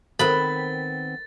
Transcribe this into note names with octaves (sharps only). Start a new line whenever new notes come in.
D#3 B3 C4 A4 A#4 C5 B5 A6